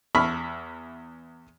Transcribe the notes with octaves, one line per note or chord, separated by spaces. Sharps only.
E2 E5 B5 C#6 E6 F6